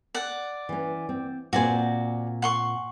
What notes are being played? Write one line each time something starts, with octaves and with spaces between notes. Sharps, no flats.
D5 F#5
E3 C#4
C4
A#2 C4 F#4 C5 D5 G#5
F#5 C6 C#6